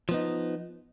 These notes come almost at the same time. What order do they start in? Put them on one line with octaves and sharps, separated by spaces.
F3 B3 D#4